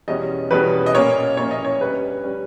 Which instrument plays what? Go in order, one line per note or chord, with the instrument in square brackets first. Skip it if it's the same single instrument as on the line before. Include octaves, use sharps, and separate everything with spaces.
[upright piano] E2 B2 G3 C#4 D#5
E2 B2 G3 C#4 B4
D#5
A#2 A#3 C#4 C#5
A#2 A#3 C#4 C#5
D#5
C#5
G2 G3 C#4 B4
G3 C#4